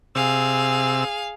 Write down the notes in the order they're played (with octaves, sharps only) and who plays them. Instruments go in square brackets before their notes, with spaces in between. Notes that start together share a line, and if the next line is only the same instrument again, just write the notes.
[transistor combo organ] C3 E6 [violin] G#4 F5